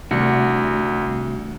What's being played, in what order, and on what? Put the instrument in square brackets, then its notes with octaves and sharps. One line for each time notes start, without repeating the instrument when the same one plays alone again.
[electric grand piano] C2 [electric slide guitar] C3 F#4 [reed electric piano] D#3 A3 D4